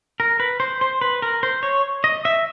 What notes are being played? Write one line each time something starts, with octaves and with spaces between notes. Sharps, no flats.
A#4
B4
C5
C5
B4
A#4
C5
C#5
D#5
E5